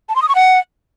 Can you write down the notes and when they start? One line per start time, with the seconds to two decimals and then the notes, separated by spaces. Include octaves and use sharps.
0.09 A5
0.16 C6
0.22 D#6
0.29 C#6
0.35 F#5